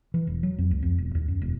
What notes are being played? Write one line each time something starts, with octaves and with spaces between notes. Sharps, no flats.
E3
E1
F#3
F2
C#2
F2
E1
D#2
F#2
E1